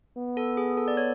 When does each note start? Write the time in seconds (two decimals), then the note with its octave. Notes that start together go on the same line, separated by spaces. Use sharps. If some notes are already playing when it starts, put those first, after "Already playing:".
0.17 B3
0.37 A4
0.57 G#4
0.77 A4
0.88 D5
0.97 C#5